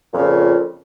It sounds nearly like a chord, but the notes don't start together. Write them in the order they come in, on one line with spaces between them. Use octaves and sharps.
A#2 F2 C#3